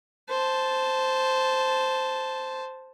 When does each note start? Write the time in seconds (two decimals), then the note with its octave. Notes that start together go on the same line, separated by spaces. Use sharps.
0.29 C5 A5